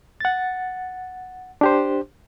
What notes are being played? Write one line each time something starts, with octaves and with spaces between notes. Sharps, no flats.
F#5 A6
D4 G4 C5